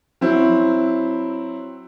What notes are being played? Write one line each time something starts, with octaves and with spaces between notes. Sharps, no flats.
F#3 C4 E4